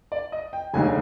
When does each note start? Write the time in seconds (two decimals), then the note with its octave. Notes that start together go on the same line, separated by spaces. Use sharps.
0.12 D5
0.32 D#5
0.53 G5
0.74 F1 D#2 D3 G#3 G#5